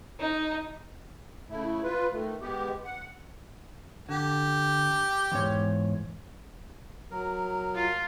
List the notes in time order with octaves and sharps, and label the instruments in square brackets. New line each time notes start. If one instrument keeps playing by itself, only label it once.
[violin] D#4
[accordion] C#3 A3 E4
F4 B4
D#3 A3
G#3 B3 G4
F#5
[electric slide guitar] D3 [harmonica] G4
[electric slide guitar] E2 G#2 C#5
[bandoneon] F#3 A#4
[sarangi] F4